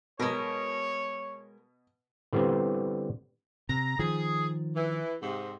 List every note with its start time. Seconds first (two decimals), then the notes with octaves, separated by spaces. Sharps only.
0.20 B2 G#3 A#4 C#5
2.33 D3 E3 G3 B3 C4
3.69 C3 A#5
3.99 D#3 F3 G#4
4.76 E3
5.22 G#2 C3